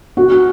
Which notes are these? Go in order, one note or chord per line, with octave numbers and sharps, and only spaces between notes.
F#4